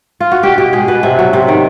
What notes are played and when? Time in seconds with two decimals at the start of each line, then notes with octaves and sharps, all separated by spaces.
0.20 F4
0.32 F#4
0.43 B2 G4
0.58 B2 G4
0.73 G#3 G#4
0.88 B2 B4
1.03 C3 E5
1.19 F#3
1.33 C3
1.48 D#3